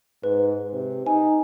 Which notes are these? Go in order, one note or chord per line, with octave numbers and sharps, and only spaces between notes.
G#2 B4
C3
D#4 G#5